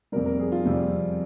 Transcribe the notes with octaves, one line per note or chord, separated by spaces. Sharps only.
F2 C3 G3 A#4
A#4
G#4
F4
F2 C3 G3